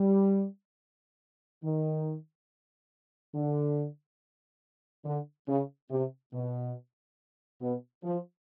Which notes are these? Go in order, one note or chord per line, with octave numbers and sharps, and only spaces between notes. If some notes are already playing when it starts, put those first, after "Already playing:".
Already playing: G3
D#3
D3
D3
C#3
C3
B2
B2
F3